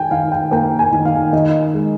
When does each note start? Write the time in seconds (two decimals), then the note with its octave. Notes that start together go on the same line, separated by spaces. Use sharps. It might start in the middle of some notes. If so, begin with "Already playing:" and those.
Already playing: D#3 G5 G#5
0.11 D#3 F5
0.32 G5
0.51 A#3 G5
0.79 G#5
0.92 D#3
1.05 F5
1.32 D#3 D#5
1.74 G#3